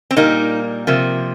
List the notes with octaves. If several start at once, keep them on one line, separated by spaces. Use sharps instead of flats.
C4
A#2 G3 A#3 D#4
C3 F3 A#3